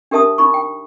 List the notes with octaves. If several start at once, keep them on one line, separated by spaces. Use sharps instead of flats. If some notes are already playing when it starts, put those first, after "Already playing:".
D4 G4 A#4 E5 A5 D#6
D#4 B5 C#6
G5